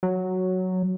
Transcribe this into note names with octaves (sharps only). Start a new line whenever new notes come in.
F#3